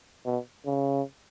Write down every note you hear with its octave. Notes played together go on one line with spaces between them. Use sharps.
B2
C#3